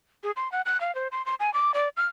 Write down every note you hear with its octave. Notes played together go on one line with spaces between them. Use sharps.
G#4
C6
F#5
F#6
F5
C5
C6
C6
G#5
D6
D5
F6